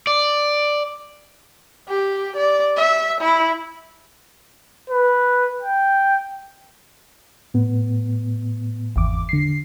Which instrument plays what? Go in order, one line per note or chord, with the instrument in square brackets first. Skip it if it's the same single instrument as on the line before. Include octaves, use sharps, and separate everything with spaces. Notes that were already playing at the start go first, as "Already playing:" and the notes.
[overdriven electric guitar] D5
[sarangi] G4
D5
E5
E4
[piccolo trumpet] B4
G5
[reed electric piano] A2 B3
[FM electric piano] G#1 E2 D6
D3 C7